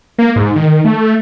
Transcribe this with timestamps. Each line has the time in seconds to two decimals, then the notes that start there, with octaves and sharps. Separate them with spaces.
0.18 A#3
0.36 G#2
0.56 D#3
0.85 A3